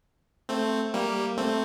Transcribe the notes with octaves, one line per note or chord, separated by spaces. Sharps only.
A3 C4
G3 A#3
A3 C4